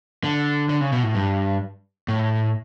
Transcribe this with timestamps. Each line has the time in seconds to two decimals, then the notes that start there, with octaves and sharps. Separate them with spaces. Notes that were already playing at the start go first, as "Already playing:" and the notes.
0.24 D3
0.69 D3
0.81 C#3
0.92 B2
1.03 A2
1.15 G2
2.08 A2